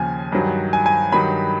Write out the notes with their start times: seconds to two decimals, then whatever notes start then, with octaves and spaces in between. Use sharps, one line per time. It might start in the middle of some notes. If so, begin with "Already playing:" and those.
Already playing: D#2 C#3 F3 G#5
0.32 G2 D#3 F#3
0.73 G#5
0.86 G#5
1.12 G2 D#3 F#3 B5